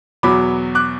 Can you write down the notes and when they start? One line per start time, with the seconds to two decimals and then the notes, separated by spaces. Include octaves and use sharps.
0.23 E2 B2 F#3 B5 D6
0.75 D6 F#6